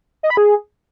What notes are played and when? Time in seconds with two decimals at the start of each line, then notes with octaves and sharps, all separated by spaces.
0.23 D#5
0.30 B5
0.37 G#4